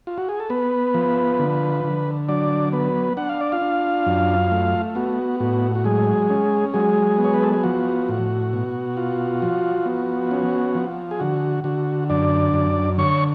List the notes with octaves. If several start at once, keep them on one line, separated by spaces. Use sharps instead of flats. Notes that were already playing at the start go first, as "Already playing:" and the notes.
F4
F#4
G#4
A4
B3 B4
F3
D3
D3
F#3 D4 D5
B3 B4
D4 F#5
F5
D5
F4 F5
D4
F#2
A3
B3 F#4
A2 F#4
F#4
F#3 G#3 G#4
C#4
F#3 G#3 G#4
B3
C#5
B4
A4
G#4
F3 F#4
A2
B2
F4
F3
B3
C#4
F3
G#4
D3 F#4
D3 F#4
F#2 D4 D5
F#2
D3 C#5 C#6